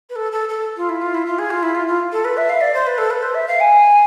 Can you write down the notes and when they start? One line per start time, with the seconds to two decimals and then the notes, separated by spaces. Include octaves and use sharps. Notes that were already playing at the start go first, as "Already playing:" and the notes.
0.09 B4
0.15 A4
0.32 A4
0.49 A4
0.76 F4
0.89 E4
1.01 F4
1.14 E4
1.26 F4
1.38 G#4
1.50 F4
1.62 E4
1.75 F4
1.87 F4
2.12 A4
2.24 B4
2.37 E5
2.49 F5
2.61 D5
2.74 C5
2.86 B4
2.98 A4
3.10 B4
3.22 C5
3.34 E5
3.47 F5
3.60 G#5